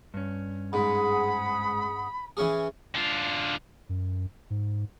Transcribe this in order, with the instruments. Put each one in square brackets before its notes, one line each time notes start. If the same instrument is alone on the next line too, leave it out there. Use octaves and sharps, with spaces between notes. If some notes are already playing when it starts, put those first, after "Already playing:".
[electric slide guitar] G2 C#4
[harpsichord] G#2 [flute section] G#4 F#5 D#6 [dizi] B5
[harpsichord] E3 C#4 G#4
[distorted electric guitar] D3 F4
[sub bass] F#2
G#2